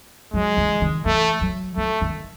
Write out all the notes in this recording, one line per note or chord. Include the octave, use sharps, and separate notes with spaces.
F#3 G#3
E3
D#3
E3 A3
F#3
F#3 A3
D#3